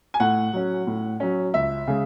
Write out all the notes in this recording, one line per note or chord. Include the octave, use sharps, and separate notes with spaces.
G#5
A2 F#5
F#3 C#4
A2
F#3 C#4
C#2 E5
C#3 G#3